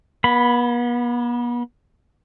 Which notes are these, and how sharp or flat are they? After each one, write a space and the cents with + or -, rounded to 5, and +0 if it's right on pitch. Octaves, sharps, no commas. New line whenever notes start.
B3 -40 B5 +0